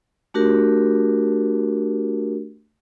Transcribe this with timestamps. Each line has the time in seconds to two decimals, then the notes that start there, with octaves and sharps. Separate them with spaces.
0.34 A3 D4 F#4 G4 A#4